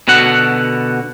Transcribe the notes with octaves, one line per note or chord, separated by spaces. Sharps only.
B2 D3 F#4 F#5